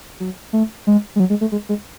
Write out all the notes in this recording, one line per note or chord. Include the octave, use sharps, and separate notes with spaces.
F#3
A3
G#3
G#3
F#3
G#3
A3
G#3
G#3